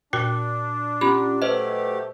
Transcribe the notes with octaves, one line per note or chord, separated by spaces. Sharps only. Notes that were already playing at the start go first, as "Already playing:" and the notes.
A#2 D4 F#4 G5
C#4 F4 G4 B5
F#3 A3 G4 B4 C5 D#5